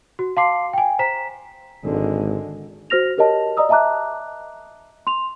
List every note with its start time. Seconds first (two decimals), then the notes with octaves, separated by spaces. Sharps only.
0.19 F#4
0.37 F5 A5 C6 D6 C7
0.73 G5 G#5
0.99 C5 A#5 B6 E7
1.84 G#1 D3 G#3
2.90 F#4 C5 F6 A#6 F7
3.18 G4 A#4 C#5 D#5 A5
3.57 D5 D#5 A#5 D#6 E6
3.69 D#5 E5 A5 A#5 D6 F#6
5.07 C6 F7